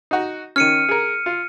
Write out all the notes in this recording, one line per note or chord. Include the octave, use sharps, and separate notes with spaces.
D#4 F#4
D#3 C#4 F6 C#7 D#7
G#4 A#4
F4